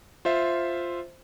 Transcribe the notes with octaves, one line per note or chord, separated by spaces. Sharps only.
F4 C5 E5